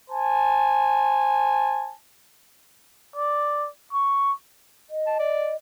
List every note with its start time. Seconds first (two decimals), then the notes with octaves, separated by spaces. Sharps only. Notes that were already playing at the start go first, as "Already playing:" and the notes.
0.10 C5 G#5 A5
3.16 D5
3.93 C#6
4.90 D#5
5.06 A5
5.19 D5